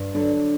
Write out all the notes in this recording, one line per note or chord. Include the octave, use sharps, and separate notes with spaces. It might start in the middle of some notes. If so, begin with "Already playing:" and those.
Already playing: G2
D3 F#3 D4